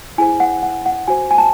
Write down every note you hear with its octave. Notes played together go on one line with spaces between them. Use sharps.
E4 G#4 C5 G#5
F#5
F#5
F#5
F#4 C5 G#5
G#5
A5